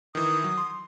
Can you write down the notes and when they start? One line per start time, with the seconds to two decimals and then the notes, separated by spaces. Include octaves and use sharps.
0.15 D#3 E3 D#6
0.44 F#3
0.57 C6